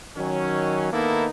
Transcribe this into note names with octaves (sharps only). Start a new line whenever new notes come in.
D#3 F#3 C#4
D#3 A#3 B3 D#4 E4 A4